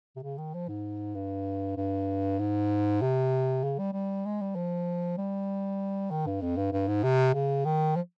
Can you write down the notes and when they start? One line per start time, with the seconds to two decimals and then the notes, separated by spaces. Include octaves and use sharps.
0.16 C3
0.23 C#3
0.38 D#3
0.54 F3
0.68 G#2
1.15 G2
1.77 G2
2.39 G#2
3.01 C3
3.63 C#3
3.79 G3
3.93 G3
4.25 G#3
4.41 G3
4.56 F3
5.17 G3
6.11 D#3
6.26 G2
6.41 F2
6.57 G2
6.73 G2
6.88 G#2
7.03 C3
7.34 C#3
7.65 D#3
7.96 F3